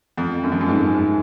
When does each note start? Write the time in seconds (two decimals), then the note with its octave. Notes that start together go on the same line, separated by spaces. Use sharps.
0.18 F2
0.43 F#2
0.52 F2
0.60 F#2
0.68 G#2
0.94 G#2